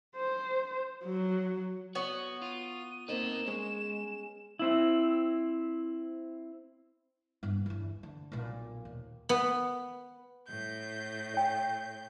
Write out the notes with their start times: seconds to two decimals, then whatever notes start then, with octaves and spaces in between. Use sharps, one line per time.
0.16 C5
1.04 F#3
1.95 B3 F#4 C#5
2.42 F4 D#7
3.08 A#3 C4 D#4 B4 D#5 E7
3.47 G#3 C#4 G#4
4.59 C4 E4
7.43 G2 B3
7.66 G1 E2
8.03 D3
8.32 B1 A#2
8.85 D#2
9.29 B3
10.48 A2 G6
11.34 C#5 G5